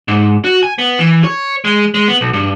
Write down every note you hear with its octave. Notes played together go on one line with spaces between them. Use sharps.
G#2
F#4
G#5
B3
E3
C#5
G#3
G#3
B3
B1
G2